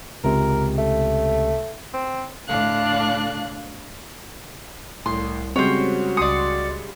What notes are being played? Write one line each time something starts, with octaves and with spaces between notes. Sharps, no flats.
C#2 C3 A#4
A3
C4
A2 D3 D4 F5 F#6
C2 A2 C6
C#3 G3 G#3 C4 F#4 C5 C#5
C#2 D5 C6 D#6 C#7